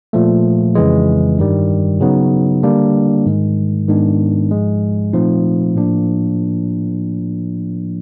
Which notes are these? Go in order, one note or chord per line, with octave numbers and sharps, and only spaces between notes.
A#2 F3 A3
F2 C#3 E3 G#3
G2 D#3 G3
C#3 F#3 B3 D#4
D3 G3 A#3 D4
G#2 D#3 G#3
G#2 D#3 G#3 B3 D4
G#2 F3 G#3
A#2 F3 A3 C4 D#4
A2 F3 A#3 D4